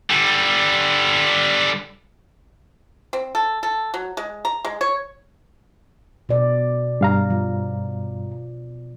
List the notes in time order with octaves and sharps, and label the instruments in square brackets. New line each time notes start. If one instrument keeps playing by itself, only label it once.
[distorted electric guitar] D3 G3
[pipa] C4
A4
A4
F#3
G#3
A#5
G#3
C#5
[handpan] B2 D5
[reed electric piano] G2 F5 A#5
[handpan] F3